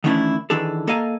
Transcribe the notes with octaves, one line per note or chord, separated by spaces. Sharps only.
D#3 E3 A3 C#4 D4 E4
D#3 E3 D4 G#4 A4
A#3 A4 D#5 F5 G#5 A#5